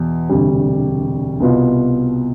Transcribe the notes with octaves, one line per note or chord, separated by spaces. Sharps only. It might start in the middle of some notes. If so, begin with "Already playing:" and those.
Already playing: E2 B2
E1 D2 C3 G3
C2 B2 B3 F4